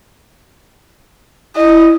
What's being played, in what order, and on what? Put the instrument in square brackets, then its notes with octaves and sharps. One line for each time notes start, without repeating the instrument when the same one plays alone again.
[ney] E4 [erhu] D#5